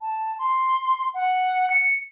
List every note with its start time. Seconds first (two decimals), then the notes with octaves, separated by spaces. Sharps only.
0.02 A5
0.39 C6
1.14 F#5
1.70 C#7